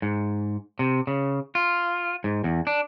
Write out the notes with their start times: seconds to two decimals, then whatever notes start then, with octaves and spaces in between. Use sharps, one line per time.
0.02 G#2
0.79 C3
1.07 C#3
1.55 F4
2.24 G#2
2.44 E2
2.67 D4